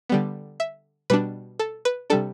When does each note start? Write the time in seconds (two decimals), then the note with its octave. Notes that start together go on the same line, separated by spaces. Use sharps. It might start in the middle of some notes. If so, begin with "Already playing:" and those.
0.09 D3 G3 B3
0.60 E5
1.10 B2 G3 D4 B4
1.59 A4
1.85 B4
2.10 C3 G3 D4 A4